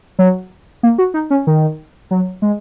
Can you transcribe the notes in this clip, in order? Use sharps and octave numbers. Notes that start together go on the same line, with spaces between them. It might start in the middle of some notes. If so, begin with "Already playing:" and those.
F#3
A#3
F#4
D#4
C#4
D#3
F#3
G#3